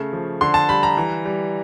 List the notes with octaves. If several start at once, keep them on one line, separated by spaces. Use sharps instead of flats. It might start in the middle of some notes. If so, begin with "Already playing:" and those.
Already playing: C#3 A3
F3
D3 C6
A5
G3 B5
A#5
E3
G3